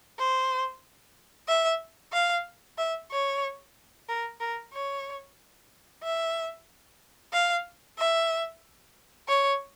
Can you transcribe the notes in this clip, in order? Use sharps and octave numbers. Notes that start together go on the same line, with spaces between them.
C5
E5
F5
E5
C#5
A#4
A#4
C#5
E5
F5
E5
C#5